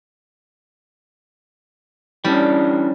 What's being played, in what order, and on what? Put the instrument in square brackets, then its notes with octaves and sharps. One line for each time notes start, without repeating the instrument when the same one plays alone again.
[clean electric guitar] E3 C#4 D4 [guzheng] G3